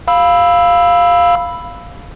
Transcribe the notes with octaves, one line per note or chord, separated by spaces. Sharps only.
F5 B5 E6